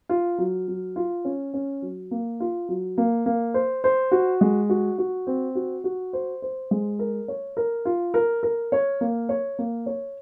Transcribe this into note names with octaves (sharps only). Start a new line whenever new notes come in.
F4
F#3
F#3
F4
C#4
C#4
F#3
A#3
F4
F#3
A#3
A#3
C5
C5
F#4
G#3
F#4
F#4
C4
F#4
F#4
C5
C5
G#3
A#4
C#5
A#4
F4
A#4
A#4
C#5
A#3
C#5
A#3
C#5